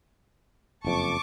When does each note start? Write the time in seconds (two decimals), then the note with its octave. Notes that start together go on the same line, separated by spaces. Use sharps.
0.84 F#1 F2 A5 C#6 D6